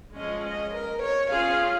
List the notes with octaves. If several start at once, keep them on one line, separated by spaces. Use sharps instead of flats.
F3 G#3 C#4 G#4 D#5
D#5
A#4
C#5
C#4 F4 G#4 F5